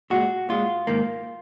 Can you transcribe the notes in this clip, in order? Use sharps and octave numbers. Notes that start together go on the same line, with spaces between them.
A#2 G#3 F#4
A#2 G#3 F4
G#2 D#3 A#3